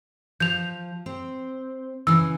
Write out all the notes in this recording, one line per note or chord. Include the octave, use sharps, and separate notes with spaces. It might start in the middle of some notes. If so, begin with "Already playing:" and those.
F3 G6 F7
C4
C#3 E3 E6